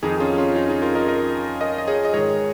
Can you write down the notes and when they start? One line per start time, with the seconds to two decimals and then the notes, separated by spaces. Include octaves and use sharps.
0.03 F2 D#3 D#4 G#4
0.20 C#4 F4
0.38 C#4 F4
0.55 D#4 G#4
0.69 D#4 G#4
0.82 F4 A#4
0.95 A#4 D#5
1.08 A#4 D#5
1.61 A#4 D#5
1.78 D#5
1.87 G#4 C#5
2.05 D#5
2.14 G#2 D#3 G#4 C#5